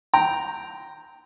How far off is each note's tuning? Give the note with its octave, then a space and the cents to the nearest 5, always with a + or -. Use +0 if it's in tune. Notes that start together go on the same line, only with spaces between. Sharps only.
G5 +0 A#5 +0